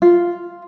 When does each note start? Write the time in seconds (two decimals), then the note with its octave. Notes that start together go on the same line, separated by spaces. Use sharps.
0.02 F4